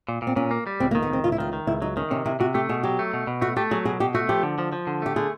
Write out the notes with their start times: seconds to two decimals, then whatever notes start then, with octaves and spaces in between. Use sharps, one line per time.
0.08 A#2
0.22 A#2
0.27 C4
0.36 A#2 C#4
0.51 A#3
0.67 G3
0.80 C#2 C4
0.91 A#3
0.95 D#3
1.02 B3
1.10 C#2 C4
1.24 C#2 F4
1.32 E4
1.38 D#3 F4
1.53 D#3
1.67 C#2 E4
1.82 F#3 D#4
1.97 D#3 C#4
2.11 C3 C#4
2.26 C3 E4
2.40 C3 F#4
2.54 A3 G4
2.69 B2 G#4
2.83 F#3 G4
2.99 A3
3.14 B2
3.27 B2
3.41 A3 F#4
3.56 A3 G4
3.71 F#3 G#4
3.85 B2 G#4
4.00 B2 G4
4.14 A3 F#4
4.29 F3 G4
4.43 D3
4.59 F3
4.73 F3
4.87 D3
5.02 A3 G4
5.16 D3 G#4